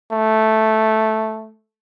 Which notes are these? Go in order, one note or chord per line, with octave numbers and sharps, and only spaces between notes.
A3